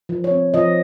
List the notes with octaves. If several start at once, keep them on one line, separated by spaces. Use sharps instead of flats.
F3
C#5
C4
F3 D#5